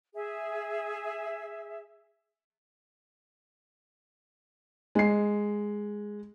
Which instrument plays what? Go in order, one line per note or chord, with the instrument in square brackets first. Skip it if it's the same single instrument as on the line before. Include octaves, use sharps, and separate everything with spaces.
[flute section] G#4 E5
[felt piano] G#3 C7